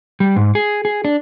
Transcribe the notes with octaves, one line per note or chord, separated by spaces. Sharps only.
G3
G#2
G#4
G#4
D4